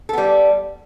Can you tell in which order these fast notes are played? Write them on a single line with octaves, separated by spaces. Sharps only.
A4 B3 G3